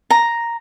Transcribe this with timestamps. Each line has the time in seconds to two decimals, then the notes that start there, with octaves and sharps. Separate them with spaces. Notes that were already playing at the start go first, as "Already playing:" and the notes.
0.10 A#5